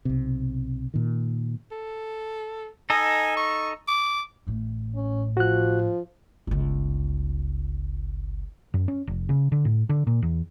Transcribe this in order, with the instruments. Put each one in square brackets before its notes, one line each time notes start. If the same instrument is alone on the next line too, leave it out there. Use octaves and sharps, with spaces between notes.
[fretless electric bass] B1 C3
A#2 D#3
[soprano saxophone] A4
[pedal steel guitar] D#4 A4 D#5 [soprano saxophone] G#5
[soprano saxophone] C#6
D6
[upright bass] A1 A2
[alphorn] C#4
[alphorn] F3 [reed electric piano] F#4 F#6
[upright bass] G1 C#2
[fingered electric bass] F#2
C#4
F1
C#3
D3
A2
D3
A#2
E2